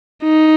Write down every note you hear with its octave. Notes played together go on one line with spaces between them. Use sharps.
D#4